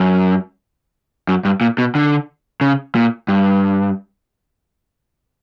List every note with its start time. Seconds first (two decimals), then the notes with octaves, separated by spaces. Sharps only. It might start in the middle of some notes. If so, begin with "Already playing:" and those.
Already playing: F#2
1.28 F#2
1.45 G2
1.61 A#2
1.78 B2
1.95 D3
2.61 C#3
2.95 A#2
3.28 G2